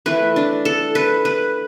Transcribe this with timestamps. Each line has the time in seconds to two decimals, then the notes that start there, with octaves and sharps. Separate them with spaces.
0.06 E3 A3 B4
0.36 D4
0.65 A4
0.95 B4
1.25 B4